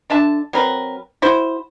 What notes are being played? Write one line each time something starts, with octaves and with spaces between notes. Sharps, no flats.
D3 D4 E5 A5
F#3 C4 A#4 B4
E4 F#4 C5